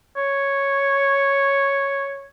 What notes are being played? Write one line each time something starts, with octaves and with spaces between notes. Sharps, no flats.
C#5